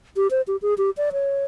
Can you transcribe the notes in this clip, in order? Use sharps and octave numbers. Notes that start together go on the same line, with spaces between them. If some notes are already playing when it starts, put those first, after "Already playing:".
G4
C5
G4
G#4
G4
D5
C#5